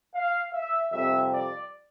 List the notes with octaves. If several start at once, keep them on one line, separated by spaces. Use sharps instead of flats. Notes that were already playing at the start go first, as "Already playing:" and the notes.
F5
E5
F2 C3 G3 C4 E5
D5